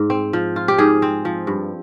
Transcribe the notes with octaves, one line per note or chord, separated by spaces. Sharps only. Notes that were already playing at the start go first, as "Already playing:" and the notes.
Already playing: G#2
C4
F3
F4
G4
G#2 G#4
C4
F3
G2